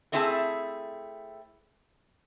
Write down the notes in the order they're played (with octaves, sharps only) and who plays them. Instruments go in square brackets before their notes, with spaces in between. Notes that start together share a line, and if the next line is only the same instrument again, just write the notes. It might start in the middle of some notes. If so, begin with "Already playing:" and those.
[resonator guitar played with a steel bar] A3 C4 D4 E4 G#4 A5